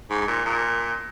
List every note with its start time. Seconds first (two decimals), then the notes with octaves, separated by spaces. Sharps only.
0.10 G#2
0.27 A#2
0.45 A#2